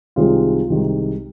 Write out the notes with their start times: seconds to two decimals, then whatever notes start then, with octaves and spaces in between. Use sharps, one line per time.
0.16 C2 C3 D#3 G#3 F4
0.70 C2 C3 D#3 G#3